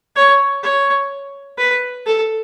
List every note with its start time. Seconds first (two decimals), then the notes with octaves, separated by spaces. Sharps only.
0.16 C#5
0.63 C#5
1.58 B4
2.06 A4